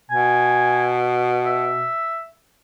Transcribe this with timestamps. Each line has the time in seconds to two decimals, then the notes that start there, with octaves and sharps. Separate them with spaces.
0.11 B2 G#5
1.45 E5